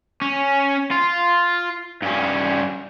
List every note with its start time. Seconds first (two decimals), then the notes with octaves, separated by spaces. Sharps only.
0.21 C#4
0.91 F4
2.02 G2 C#4